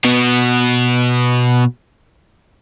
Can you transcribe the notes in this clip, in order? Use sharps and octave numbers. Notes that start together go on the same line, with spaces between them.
B2 B3